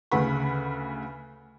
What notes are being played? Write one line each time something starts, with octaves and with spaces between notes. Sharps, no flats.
D2 C#3 B4 F#5 B5